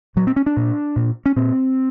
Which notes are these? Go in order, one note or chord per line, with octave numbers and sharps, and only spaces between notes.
A#2 F#3
C4
C#4
D4
A#2
A#2
C#4
A#2 C4